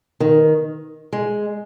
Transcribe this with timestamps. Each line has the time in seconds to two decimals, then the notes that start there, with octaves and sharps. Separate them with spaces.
0.20 D#3
1.13 G#3